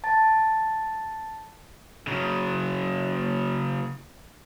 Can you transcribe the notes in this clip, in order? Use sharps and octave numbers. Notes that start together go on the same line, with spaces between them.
A5 A6
C#3 F#3